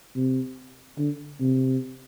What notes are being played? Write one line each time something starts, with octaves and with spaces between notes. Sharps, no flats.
C3
D3
C3